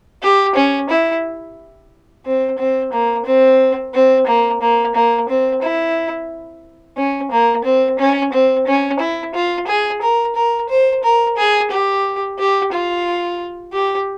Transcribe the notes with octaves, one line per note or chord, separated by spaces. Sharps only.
G4
C#4
E4
C4
C4
A#3
C4
C4
A#3
A#3
A#3
C4
E4
C#4
A#3
C4
C#4
C4
C#4
E4
F4
G#4
A#4
A#4
C5
A#4
G#4
G4
G4
F4
G4